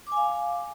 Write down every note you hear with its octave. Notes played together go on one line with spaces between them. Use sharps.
F5 G#5 D6